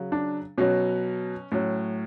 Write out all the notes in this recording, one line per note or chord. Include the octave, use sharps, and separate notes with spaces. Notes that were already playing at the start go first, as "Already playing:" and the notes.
Already playing: C#3 F#3
D4
B2 F#3 C#4
A2 F#3 C#4